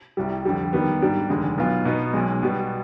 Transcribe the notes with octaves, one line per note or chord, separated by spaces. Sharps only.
C2 C3 G3
F2 D3 G3
D#2 D#3 G3 B3
G#2 G3 D4
F1 D#2 D3 G#3
B1 B2 B3 F4
B2 B3 D#4
B1 B2 G#3
B2 G3 B3